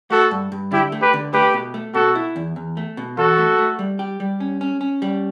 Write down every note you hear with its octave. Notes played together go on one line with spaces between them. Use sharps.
A3 F#4 A4
G2
G2
D3 E4 G4
A3
G4 B4
D3
A3 G4 B4
B2
A3
B2 F#4 A4
E4
E2
E2
A3
B2
E2 F#4 A4
A3
A3
G3
G4
G3
C#4
C#4
C#4
G3